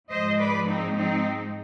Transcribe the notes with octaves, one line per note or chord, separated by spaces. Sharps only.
G#2 F3 G#3 C5 D#5
B4 D5
C4 D#4
C4 D#4